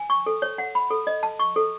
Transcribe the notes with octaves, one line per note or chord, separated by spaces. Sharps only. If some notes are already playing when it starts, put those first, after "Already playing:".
Already playing: G#5
C#6
A4
C#5
F#5
B5
A4
D#5
A5
C#6
A4